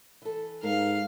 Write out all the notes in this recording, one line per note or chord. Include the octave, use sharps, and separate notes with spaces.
E3 A4
G#2 A#4 F5